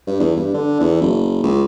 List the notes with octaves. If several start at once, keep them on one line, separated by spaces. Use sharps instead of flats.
G2
E2
G2
D3
E2
F#1
C#2